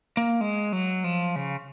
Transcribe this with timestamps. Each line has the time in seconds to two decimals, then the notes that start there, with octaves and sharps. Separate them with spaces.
0.17 A#3
0.41 G#3
0.73 F#3
1.04 F3
1.36 C#3